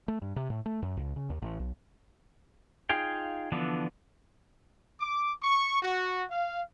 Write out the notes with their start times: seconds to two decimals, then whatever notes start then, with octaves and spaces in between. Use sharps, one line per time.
0.08 A3
0.22 G2
0.36 C3
0.50 A2
0.66 A3
0.82 F#2
0.97 C#2
1.16 C#3
1.30 D#2
1.42 A1
1.60 B1
2.89 D#4 F4 G#4 F5 G5
3.52 D3 E3 F3 B3 D4
5.01 D6
5.43 C#6
5.82 F#4
6.30 F5